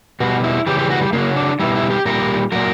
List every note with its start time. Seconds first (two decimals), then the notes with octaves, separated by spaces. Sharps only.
0.20 B2 G3 F#4
0.44 E4
0.67 C#3 E3 G3 G4
0.79 G4
0.90 F#4
1.01 G3
1.13 C#3 F#3 A#3
1.36 D4
1.60 B2 G3 E4
1.76 E4
1.90 G4
2.05 A#2 G3 A#4
2.52 A#2 F#3 A#4